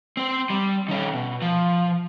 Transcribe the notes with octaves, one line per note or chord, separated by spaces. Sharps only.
C4 C5
G3
D#3 C#4
B2
F3